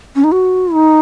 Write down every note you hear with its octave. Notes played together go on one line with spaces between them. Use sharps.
C#4
D#4
F#4
D#4